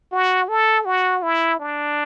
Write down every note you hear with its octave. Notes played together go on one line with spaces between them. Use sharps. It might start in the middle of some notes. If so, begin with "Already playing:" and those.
F#4
A4
F#4
E4
D4